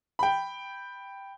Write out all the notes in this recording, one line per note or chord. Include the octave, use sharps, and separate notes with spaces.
G5 B5